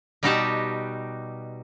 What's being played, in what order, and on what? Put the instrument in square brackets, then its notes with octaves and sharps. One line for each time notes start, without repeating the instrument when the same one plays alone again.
[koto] B2 G3 D#4 F#4 G4 A5